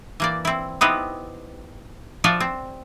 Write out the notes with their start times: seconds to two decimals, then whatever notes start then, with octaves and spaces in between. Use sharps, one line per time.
0.20 E3 A#3 D5
0.45 C4 E4
0.81 B3 C4 D#4 E4 G4 B4
2.24 F3 F4 F#4 D5 E5
2.40 C4